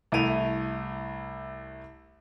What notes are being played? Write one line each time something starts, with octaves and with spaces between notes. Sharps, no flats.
C2 A3 E4 D7 D#7 F7